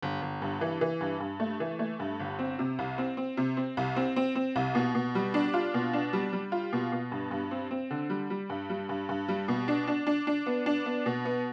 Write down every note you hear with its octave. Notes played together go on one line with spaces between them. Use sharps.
G1
G1
G2
E3
E3
G2
G2
A3
E3
A3
G2
G1
C4
C3
C2
C4
C4
C3
C4
C2
C4
C4
C4
C2
B2
B2
G3
D4
F4
B2
D4
G3
G3
F4
B2
B2
G2
G2
C4
C4
D3
G3
G3
G2
G3
G2
G2
G3
B2
D4
D4
D4
D4
B3
D4
B3
B2
B3